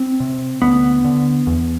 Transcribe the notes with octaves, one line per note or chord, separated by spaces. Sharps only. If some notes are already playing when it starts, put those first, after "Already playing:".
Already playing: C4
C3
D2 B3
D3
E2